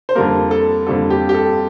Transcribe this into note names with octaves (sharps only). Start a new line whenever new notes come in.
C5
F2 D3 G3 A#3 A#4
A4
F2 D3 G3 A#3 A4
G4
G4
A4